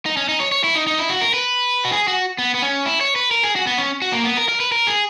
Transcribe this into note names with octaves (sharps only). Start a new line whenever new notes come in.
D#4
C#4
D#4
C#5
C#5
E4
D#4
D#4
E4
F#4
A#4
B4
F#4
G#4
F#4
B3
B3
C#4
E4
C#5
B4
A#4
G#4
F#4
B3
C#4
F#4
A#3
B3
A#4
A#4
B4
A#4
G#4